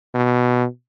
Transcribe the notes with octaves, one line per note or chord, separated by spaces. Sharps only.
B2